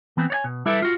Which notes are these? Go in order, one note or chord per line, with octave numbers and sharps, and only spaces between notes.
E3 B3 C4
C#5 D5 G#5
B2
G3 E4 A4 B4 D5 E5
F4 F#4